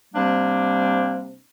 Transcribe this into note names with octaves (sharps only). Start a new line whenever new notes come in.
C3 G3 A#3 C4 D4